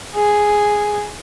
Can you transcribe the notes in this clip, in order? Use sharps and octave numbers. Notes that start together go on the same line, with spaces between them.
G#4